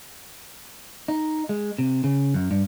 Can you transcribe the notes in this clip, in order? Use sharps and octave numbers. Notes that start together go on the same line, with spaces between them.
D#4
G#3
C3
C#3
F#2
G2